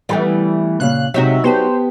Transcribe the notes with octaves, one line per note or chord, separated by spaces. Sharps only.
E3 G3 A3 B3
A#2 C#3 F5 F#6
C3 F#3 G#3 D#4 F#4 E5
B3 G4 C5 A5